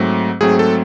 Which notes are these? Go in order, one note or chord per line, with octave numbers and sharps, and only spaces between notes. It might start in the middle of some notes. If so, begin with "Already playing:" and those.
Already playing: G#2 F#3 A3 C4
G#2 F#3 A3 C4 G#4
A4